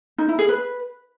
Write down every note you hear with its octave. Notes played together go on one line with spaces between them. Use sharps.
D#4
E4
G#4
B4